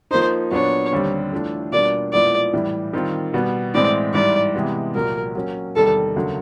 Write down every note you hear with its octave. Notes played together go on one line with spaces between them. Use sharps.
F3 A#3 D#4 C5
A#2 F#3 B3 D4 C#5
D#2 D3 G3 C4
E3 A3 D4 F4 A4
B2 G3 A#3 D4 F4 D5
A#2 F3 G#3 B3 E4 D5
A2 E3 G3
D#3 G3 C4 F4
B2 G3 B3
A2 E3 G#3 C4 D5
G#2 E3 G3 D5
C3 E3 G#3 B3
C2 A#2 F#3 A#4
F#3 A#3 C#4
E2 C3 D#3 G3 A4
D2 C#3 F#3 A#3